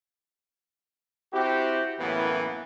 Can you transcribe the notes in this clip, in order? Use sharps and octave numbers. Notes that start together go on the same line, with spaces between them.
C4 E4 F#4 G4
F#2 A2 E3 A#3 B3